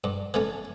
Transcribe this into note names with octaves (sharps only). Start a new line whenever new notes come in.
G2
E3 A3 C#4